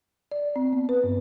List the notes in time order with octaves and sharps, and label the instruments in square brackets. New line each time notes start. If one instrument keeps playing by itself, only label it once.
[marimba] D5
C4
B3
B4
G2